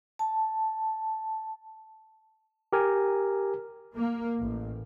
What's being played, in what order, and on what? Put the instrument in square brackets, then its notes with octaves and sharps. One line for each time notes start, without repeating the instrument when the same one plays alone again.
[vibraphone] A5
[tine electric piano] G4 A#4 G#5
[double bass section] A#3
A1